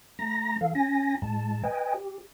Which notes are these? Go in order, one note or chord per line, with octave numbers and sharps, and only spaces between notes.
A3 A#5 A#6
E3 A4 F5
C#4 G#5 A#6
A2 G#3 A5
B4 D#5 G5 G#5
G4